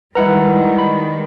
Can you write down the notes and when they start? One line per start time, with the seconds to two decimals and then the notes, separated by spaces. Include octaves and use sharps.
0.15 D#3 G3 G#3 E4 B4 D#5 F#5 A#5
0.78 B5